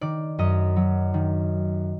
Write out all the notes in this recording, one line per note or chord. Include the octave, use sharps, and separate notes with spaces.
D#3 D5
F#2 D#5
F#3
D#3